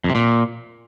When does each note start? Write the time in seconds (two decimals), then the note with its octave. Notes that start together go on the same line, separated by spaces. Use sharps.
0.04 F2
0.10 C3
0.15 A#2